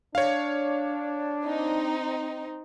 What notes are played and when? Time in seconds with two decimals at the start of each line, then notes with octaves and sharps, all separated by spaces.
0.15 D4 C#5 F5
1.45 C4 D#4